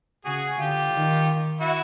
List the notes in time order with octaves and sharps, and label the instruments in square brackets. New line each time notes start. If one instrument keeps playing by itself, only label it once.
[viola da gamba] C#3 [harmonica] F#4 G#4
[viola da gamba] D3 [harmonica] F4 G4
[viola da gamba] D#3
[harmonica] E4 F#4